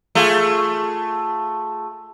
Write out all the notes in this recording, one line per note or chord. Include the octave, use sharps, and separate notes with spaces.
A3 F4 G#4